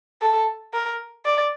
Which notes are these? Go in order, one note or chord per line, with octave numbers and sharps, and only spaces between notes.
A4
A#4
D5